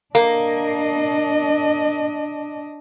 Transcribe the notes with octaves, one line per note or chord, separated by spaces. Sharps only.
A#3 D4 D#5